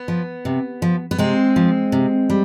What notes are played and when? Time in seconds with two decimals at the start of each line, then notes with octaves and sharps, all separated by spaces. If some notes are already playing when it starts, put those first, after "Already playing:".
Already playing: B3
0.08 F3
0.45 C3
0.82 F3
1.11 B3
1.18 C3 G#3 C4
1.56 F3
1.92 C3
2.30 G3